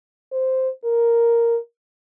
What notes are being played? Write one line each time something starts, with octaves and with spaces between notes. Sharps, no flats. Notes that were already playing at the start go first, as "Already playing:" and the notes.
C5
A#4